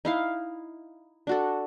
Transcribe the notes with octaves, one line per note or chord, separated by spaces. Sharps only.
D#4 E4 F5
D4 F#4 A4